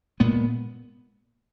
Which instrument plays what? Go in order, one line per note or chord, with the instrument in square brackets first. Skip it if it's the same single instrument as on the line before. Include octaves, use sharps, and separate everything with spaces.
[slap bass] A#2 G#3 B3